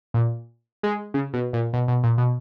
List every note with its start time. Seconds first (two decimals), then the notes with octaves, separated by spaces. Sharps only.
0.14 A#2
0.83 G#3
1.14 C#3
1.33 B2
1.53 A#2
1.73 B2
1.88 B2
2.03 A#2
2.18 B2